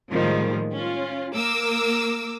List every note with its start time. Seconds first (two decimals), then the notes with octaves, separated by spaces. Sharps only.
0.11 A2 D#3 F3 G3 G#3 A#3
0.75 C#4 F4
1.33 A#3 A#4 D6 E6